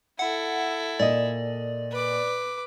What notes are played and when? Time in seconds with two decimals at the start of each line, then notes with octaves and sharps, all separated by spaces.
0.19 E4 A4 F#5
0.99 A#2 D5 D#5
1.92 B4 D6